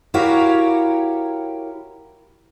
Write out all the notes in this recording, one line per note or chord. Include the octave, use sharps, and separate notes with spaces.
E4 F#4 G4 A#4 C#5 F5